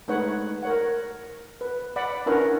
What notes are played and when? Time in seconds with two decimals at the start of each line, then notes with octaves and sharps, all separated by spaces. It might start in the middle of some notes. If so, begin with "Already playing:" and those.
0.08 G#3 A3 D#4 B4 C#5 F#5
0.63 A#4 C#5 F#5
1.61 B4
1.96 D5 F#5 B5
2.26 C#4 D4 E4 A#4 B4 F#5